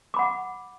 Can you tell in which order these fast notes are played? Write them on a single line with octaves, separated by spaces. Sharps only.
D6 B5 F#5